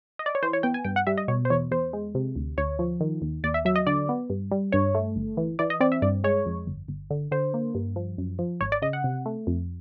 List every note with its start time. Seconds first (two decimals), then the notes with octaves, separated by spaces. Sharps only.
0.19 D#5
0.26 D5
0.35 C#5
0.43 E3 C5
0.53 C#5
0.63 B3 G5
0.74 G#5
0.85 G2 G5
0.96 F#5
1.07 G3 E5
1.18 D#5
1.28 B2 C#5
1.45 C5
1.50 E2 C#5
1.71 E2 C5
1.93 G#3
2.15 C3
2.36 D2
2.57 D2 C#5
2.79 F3
3.01 D#3
3.22 D#2
3.44 D#2 D5
3.54 E5
3.65 F#3 E5
3.76 D#5
3.87 D3 D5
4.09 B3
4.30 G2
4.52 G3
4.72 G2 C#5
4.95 A3
5.16 G1
5.37 E3
5.59 E3 D5
5.70 D#5
5.80 C4 D5
5.92 E5
6.02 G2 D5
6.24 G#3 C#5
6.46 F2
6.67 G1
6.88 G1
7.10 D3
7.31 D3 C5
7.54 A#3
7.75 G2
7.96 F3
8.18 F#2
8.39 F3
8.61 G#1 C#5
8.72 D5
8.82 C#3 D#5
8.93 F#5
9.04 C3
9.26 A3
9.47 F2